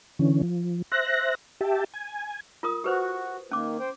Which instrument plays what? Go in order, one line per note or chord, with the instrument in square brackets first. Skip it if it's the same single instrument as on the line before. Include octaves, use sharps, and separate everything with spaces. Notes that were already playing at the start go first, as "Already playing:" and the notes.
[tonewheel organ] D3 E3 C#4
F3
C5 E5 F#6 A#6
G4 E5 G5 A5
G#5
[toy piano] F4 A#4 D#6
[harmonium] F#4 [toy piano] G4 B4 C5
[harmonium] D#3 A#3 [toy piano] C#4 D6
[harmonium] C5 G5